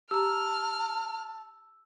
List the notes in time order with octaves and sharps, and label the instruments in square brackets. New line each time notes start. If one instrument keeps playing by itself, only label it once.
[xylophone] G4 A#5 [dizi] A5 [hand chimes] E6 [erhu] F6